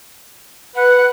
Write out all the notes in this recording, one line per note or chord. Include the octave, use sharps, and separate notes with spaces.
B4 F#5